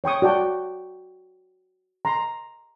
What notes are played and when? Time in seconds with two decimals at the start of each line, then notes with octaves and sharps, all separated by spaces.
0.04 C#5 G5 C#6 D#6
0.22 F#4 D5 G5 A5
2.05 A#5 C6